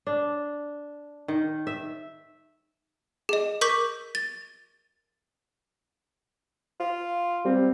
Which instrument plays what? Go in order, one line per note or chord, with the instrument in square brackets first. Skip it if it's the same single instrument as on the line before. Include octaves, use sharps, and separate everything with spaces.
[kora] D4
D#3
E5
[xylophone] G#4 D#5
A#4 C#6 D6 G6 B6
A6
[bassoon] F4
[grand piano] G3 C4